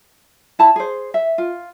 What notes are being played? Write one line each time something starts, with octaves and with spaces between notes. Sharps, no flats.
E4 A5 B5
G#4 C5
E5
F4